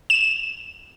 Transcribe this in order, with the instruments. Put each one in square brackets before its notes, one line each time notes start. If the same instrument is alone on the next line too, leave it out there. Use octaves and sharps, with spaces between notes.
[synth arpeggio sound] E7